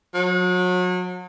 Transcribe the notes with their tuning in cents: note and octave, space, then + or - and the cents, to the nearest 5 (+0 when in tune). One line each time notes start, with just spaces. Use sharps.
F#3 -35